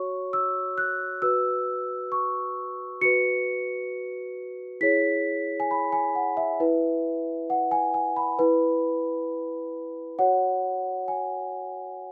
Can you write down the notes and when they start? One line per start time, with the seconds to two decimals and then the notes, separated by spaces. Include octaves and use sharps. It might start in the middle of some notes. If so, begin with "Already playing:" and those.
Already playing: F#4 C#5 C#6
0.33 E6
0.78 F#6
1.22 F#4 B4 E6
2.12 C#6
3.01 F#4 B4 C#7
4.81 E4 G#4 C#5 B6
5.60 G#5
5.71 B5
5.92 G#5
6.15 F#5
6.37 E5
6.60 E4 B4
7.50 F#5
7.71 G#5
7.94 G#5
8.16 B5
8.39 E4 B4
10.19 F#4 C#5 F#5
11.08 G#5